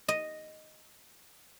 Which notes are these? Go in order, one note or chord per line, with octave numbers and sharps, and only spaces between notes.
D#5